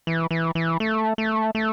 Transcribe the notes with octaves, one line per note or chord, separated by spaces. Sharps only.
E3
E3
E3
A3
A3
A3